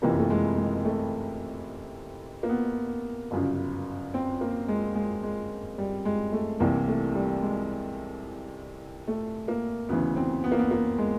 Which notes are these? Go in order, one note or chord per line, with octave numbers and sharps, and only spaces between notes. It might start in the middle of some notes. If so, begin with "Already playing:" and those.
F#1 F2 C3 E3 A#3
A3
G#3
G#3
A3
A#3
B3
G1 F#2 C#3
C4
A#3
G#3
G#3
G#3
G3
G#3
A3
C2 C3 E3 A#3
A3
G3
G#3
A3
A#3
D2 C#3 E3 B3
C4
B3
A#3
B3
A#3
G#3